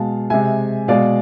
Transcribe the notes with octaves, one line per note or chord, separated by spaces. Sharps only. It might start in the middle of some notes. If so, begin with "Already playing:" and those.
Already playing: B2 G#3 F5 A5
C3 G#3 E5 G#5
B2 G#3 D5 F5